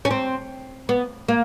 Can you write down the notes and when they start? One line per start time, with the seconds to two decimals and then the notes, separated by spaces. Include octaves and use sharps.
0.05 C#4
0.11 C4
0.89 B3
1.28 A#3